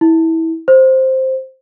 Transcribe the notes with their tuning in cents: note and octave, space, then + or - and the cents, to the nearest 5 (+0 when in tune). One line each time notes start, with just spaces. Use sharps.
E4 -25
C5 +5